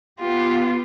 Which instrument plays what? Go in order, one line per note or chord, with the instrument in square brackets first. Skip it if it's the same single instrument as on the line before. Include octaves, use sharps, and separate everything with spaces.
[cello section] B3 G4 [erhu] F4